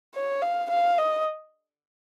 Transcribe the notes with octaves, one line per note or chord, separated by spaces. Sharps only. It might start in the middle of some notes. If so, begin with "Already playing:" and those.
C#5
F5
F5
D#5